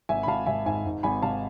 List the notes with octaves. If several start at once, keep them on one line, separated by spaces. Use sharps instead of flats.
G#1 E5 G#5
B5
G#1 F5 A5
G#1 E5 G#5
G#2 E5 G#5
G#2
G#1 G#5 B5
G#1 F5 A5